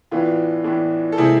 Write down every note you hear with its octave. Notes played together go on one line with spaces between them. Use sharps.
A2 E3 B3 D4 F4
A2 E3 B3 D4
A4
C3 G#3 C4 E4 G#4